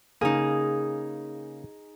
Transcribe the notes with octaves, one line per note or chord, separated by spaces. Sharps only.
C#3 A#3 D#4 G#4